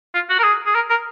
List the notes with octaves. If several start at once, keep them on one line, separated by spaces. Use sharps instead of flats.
F4
F#4
A#4
G#4
G#4
A#4
A#4